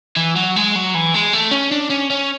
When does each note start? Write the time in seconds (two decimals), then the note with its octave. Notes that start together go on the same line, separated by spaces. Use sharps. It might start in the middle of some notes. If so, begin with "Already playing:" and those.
0.16 E3
0.36 F#3
0.56 G#3
0.75 F#3
0.94 E3
1.14 G#3
1.33 A3
1.51 C#4
1.71 D4
1.90 C#4
2.10 C#4